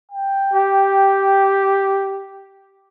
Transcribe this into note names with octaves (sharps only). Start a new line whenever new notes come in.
G5
G4